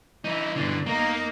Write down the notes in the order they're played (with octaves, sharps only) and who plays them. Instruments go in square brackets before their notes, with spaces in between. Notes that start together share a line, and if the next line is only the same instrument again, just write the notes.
[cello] E3 [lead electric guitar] D#4 E4
[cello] G2 B2 [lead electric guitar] D3 E3
[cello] E2 D#4 [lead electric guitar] A#3 A#4